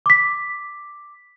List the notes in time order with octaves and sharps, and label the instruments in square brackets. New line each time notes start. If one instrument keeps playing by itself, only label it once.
[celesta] D6 B6